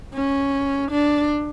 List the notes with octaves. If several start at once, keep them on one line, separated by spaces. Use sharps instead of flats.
C#4
D4